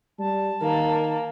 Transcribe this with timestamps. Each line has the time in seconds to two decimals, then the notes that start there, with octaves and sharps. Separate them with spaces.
0.19 G3 A5
0.62 D#3 A#3